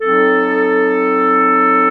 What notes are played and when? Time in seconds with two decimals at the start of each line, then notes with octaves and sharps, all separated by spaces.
0.01 F#3 C4 D#4 A4